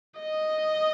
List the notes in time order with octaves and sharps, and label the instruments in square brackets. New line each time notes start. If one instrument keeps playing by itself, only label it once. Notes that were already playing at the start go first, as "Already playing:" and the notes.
[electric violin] D#5